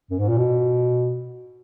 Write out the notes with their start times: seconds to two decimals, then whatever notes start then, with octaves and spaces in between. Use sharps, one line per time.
0.10 F#2
0.19 G#2
0.28 A#2
0.37 B2